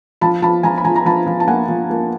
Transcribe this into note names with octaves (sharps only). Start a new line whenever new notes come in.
F3 A5 B5
F3 A5 B5
F3 G#5 A#5
B5
F3 G#5 A#5
A#5
F3 A5 B5
F3
A5
A#3 F#5 G#5
F3
A#3